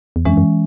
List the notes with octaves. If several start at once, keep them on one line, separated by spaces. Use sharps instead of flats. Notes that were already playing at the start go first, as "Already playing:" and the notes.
E2
F2 E3 G#3 C#4
F#2